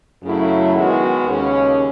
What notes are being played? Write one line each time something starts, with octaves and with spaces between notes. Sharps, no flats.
F#2 C#3 F#3 A3 E4
D#3 G#3 B3 F#4
D#2 C#3 G#3 C#4 G#4